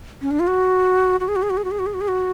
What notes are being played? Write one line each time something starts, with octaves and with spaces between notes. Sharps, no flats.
C#4
D4
F4
F#4
F#4
G#4
F#4
G#4
F#4
G#4
F#4
G#4
F#4
G#4
F#4
G#4
F#4